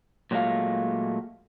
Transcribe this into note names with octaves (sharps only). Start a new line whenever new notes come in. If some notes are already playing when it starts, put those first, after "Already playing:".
A#2 F#3 G#3 A3 F5